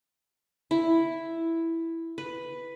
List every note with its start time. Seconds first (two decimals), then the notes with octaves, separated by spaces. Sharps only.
0.71 E4
2.18 B4